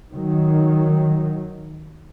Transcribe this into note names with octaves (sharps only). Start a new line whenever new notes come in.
D#3 F#3